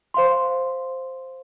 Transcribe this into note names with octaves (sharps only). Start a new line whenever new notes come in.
C5 F5 C6